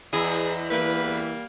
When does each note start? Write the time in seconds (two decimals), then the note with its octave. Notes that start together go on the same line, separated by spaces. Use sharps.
0.13 E2 E4 G#4 D#5
0.70 E3 G3 A#3 B4